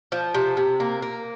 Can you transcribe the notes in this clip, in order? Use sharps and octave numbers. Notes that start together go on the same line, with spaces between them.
F3
C3
C3
A#3
A#3